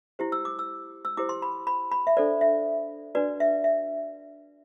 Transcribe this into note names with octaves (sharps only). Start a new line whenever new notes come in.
E4 G4 C5
E6
D6
E6
E6
E4 G4 C5 D6
C6
B5
B5
B5
E5
D4 A4 C5 D5
E5
D4 F#4 B4 D5
E5
E5